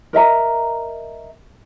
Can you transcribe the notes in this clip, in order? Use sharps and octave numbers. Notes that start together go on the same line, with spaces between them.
A#4 D#5 E5 A#5